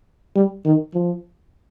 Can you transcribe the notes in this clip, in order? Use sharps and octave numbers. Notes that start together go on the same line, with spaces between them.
G3
D#3
F3